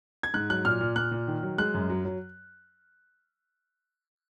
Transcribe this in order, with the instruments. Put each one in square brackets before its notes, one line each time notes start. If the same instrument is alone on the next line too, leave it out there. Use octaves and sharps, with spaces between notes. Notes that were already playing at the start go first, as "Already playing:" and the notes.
[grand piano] G#6
G#2 F#6
F#3 F#6
A#2 F6
A#2
A#2 F#6
A#2
D#3
F#3
G#3 F#6
F#2
F#3
F#3